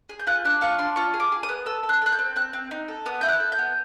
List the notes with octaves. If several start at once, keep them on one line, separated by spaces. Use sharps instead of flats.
G#4
G6
F4 F#6
D4 F#6
F4 C#6
D4 C6
F4 C#6
G#4
D6
G#4
D#6
B3
A4 E6
A4
F#6
A4 F#6
G6
C4
C4 F#6
C4
D#4
A4
B3 D#6
E4 G6
F#6
A4
G6
B3